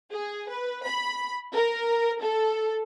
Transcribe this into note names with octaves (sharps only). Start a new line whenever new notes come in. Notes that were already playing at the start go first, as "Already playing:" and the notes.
G#4
B4
B5
A#4
A4